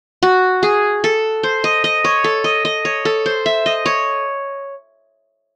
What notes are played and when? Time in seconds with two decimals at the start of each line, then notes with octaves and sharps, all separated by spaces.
0.23 F#4
0.63 G#4
1.04 A4
1.43 C5
1.64 D#5
1.84 D#5
2.05 C#5
2.24 A4
2.44 D#5
2.65 D#5
2.85 C#5
3.05 A4
3.26 C5
3.46 E5
3.66 D#5
3.86 C#5